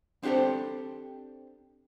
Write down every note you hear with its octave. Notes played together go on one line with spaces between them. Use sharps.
C4 D4 G4 A4 C5